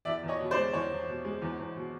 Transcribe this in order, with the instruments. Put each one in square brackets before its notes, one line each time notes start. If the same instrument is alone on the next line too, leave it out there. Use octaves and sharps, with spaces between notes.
[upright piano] E2 D5 E5
E2
C#5 D#5
B2
C5 D5
G#3
E2 C#5
E2
B2
G#3
E2
E2
B2